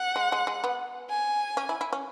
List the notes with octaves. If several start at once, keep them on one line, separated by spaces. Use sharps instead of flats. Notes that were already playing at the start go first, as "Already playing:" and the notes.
Already playing: F#5
G#3
G#3
G#3
B3
G#5
C#4
E4
E4
C#4